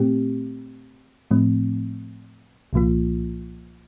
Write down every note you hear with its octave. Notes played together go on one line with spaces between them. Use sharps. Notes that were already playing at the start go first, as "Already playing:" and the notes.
Already playing: A#2 A3 C4 G4
A2 F3 A3 C4
C2 A#2 F3 A#3 F4